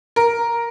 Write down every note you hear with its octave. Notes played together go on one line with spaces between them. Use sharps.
A#4